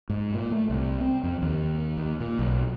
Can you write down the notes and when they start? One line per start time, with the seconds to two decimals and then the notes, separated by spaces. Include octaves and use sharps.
0.10 G#2
0.34 A#2
0.52 A3
0.70 C2
1.01 C4
1.23 F2
1.42 D#2
1.97 D#2
2.20 A#2
2.39 B1